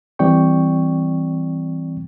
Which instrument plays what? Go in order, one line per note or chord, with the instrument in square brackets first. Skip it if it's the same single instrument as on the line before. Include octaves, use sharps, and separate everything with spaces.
[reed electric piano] E3 G3 C4 D5 G5 C#6